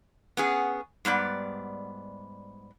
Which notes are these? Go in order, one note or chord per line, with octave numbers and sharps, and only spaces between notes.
B3 C#4 G#4
G#2 G3 B3 D5